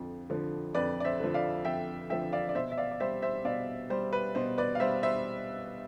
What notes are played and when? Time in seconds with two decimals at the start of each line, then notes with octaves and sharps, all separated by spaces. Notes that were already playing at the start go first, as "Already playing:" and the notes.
Already playing: F2 D3 F3
0.30 D3 F3
0.75 F2 B4 D5
1.00 D5
1.05 C5 E5
1.20 D3 F3
1.34 D5 F5
1.65 F2 E5 G5
2.10 D3 F3 E5 G5
2.32 D5 F5
2.49 D5
2.55 B2 C5 E5
2.72 E5
2.78 D5 F5
2.91 D5
3.00 G3 C5 E5
3.22 C5 E5
3.45 B2 D5 F5
3.90 G3 C5
4.13 B4
4.35 B2 C5
4.58 B4 D5
4.75 F5
4.80 G3 C5 E5
5.03 C5 E5